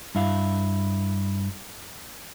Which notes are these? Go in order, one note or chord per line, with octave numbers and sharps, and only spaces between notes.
G2 E4 F5